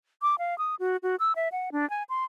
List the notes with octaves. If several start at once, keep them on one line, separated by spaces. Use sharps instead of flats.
D6
F5
D#6
F#4
F#4
E6
E5
F#5
D4
G#5
C6